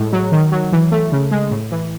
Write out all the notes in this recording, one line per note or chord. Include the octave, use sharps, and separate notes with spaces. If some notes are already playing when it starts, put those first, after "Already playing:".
Already playing: A2 G#3
F#3
D#3
F#3
E3
A3
C#3
G#3
A2
E3